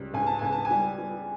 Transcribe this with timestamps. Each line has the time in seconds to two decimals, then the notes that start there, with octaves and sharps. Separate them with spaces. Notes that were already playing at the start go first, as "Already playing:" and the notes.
Already playing: C#2 G3
0.14 C#2 G#5
0.26 A5
0.39 C#2 G#5
0.52 A5
0.65 G#5
0.71 G3
0.98 G3